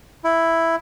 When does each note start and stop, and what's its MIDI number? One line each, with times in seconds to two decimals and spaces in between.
0.24 0.76 64